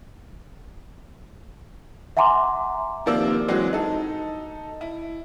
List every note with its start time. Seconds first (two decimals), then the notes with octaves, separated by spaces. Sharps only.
2.17 E5 F#5 G#5 A#5 C6 D6
3.06 C3 D#3 F3 A#3 D5 E6
3.48 E3 F#3 G#3 C4
3.73 D#4 A4
4.81 E4